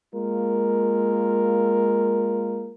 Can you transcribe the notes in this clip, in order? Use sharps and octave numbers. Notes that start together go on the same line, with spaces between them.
G#3 A#3 F4 A#4